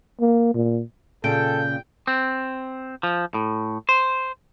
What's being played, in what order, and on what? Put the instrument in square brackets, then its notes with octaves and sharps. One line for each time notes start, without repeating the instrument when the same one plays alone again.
[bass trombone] A#3
A#2
[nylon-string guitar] A#2 C#3 [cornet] A4 [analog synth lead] G5
[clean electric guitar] C4
F3
A2
C5